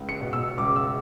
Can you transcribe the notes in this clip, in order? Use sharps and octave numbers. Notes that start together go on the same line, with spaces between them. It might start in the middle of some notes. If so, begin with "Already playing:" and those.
Already playing: C#2
C#7
B2
E6
C#2 D6
E6